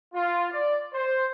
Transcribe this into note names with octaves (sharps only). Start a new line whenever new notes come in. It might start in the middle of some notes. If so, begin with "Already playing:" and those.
F4
D5
C5